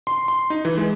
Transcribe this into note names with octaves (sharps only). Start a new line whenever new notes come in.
C6
C6
D#4
E3
G#3